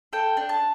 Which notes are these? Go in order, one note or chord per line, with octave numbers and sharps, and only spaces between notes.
A4 G5
D4
A5